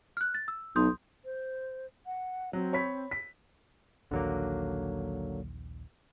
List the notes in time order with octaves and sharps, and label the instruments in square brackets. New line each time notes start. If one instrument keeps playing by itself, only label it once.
[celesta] F6 F#6
A6
E6
[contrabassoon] B1 [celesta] C6 D#6 G6
[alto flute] C5
F#5
[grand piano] F#3 [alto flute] C4
[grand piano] C#5 B5 B6
B6
[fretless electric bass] A#1 D#2 [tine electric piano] D3 F#3 A#3